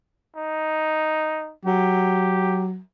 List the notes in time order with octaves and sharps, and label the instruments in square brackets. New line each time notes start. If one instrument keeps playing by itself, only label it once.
[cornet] D#4
[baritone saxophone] F#3 [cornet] G4